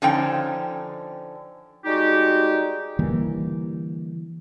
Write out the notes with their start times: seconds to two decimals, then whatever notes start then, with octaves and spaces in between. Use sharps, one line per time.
0.02 D3 F3 C#4 D#4 G5
1.85 G3 G#3 D#4 F#4 G4
2.99 D3 E3 G3 A#3